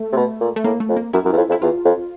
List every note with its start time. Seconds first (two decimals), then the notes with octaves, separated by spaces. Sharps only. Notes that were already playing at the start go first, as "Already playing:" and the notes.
Already playing: A3
0.12 C3
0.16 B2
0.41 A#2
0.56 A3
0.64 A2 A#3
0.80 A3
0.89 F2
0.97 A#3
1.13 F#2 E4
1.25 F#2
1.32 E2
1.37 F2
1.50 F2 E4
1.62 E2 F4
1.85 F2